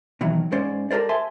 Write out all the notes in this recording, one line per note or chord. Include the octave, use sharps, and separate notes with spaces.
B2 D#3 E3 F#3
G#2 C#4 C5 D5
G4 A4 A#4 C5 D5
E5 G#5 A5 C6